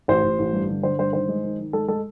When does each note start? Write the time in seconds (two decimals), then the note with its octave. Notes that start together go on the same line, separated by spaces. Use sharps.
0.08 A1 C5
0.23 A1
0.39 A1
0.53 G2
0.69 D3
0.83 D3 C5
0.99 G2 C5
1.13 D#3 C5
1.28 G#3
1.44 D#3
1.59 D#3
1.73 G#3 A4
1.88 G#3 A4